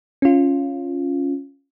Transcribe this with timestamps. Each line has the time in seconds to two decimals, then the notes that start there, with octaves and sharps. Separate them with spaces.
0.22 C#4 F4